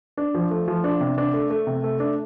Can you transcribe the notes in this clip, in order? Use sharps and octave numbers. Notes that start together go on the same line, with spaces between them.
D4
F3
A3
F3
D4
C3
D4
A3
A3
C3
A3
D4